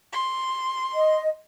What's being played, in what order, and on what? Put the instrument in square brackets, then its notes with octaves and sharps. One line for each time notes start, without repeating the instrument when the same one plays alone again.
[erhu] C6
[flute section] D#5